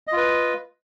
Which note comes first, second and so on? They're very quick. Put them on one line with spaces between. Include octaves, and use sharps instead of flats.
D#5 F4 B4